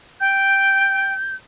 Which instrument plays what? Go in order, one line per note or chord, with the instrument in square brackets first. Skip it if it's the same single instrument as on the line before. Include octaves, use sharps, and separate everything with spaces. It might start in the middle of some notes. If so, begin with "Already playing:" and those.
[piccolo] G5 [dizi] G6